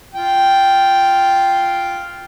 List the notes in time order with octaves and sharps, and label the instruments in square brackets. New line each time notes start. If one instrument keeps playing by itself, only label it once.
[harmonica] F4 G5